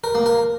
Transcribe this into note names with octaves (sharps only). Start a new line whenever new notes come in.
A#4
A#3
A#4